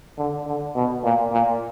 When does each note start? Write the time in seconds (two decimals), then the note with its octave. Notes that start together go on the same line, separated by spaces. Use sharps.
0.18 D3
0.46 D3
0.75 B2
1.04 A#2
1.32 A#2